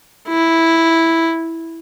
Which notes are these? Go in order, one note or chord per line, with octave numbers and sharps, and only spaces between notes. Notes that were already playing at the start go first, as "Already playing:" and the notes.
E4